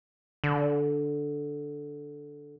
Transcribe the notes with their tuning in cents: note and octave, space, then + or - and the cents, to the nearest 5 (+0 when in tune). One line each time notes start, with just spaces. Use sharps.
D3 -5